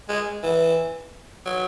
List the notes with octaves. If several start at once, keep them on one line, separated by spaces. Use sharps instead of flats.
G#3
E3
F#3